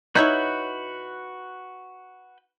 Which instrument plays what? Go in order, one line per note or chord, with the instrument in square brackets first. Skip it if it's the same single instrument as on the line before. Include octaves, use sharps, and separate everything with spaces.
[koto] D#4 E4 C#5 [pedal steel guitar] F#4 B4 G6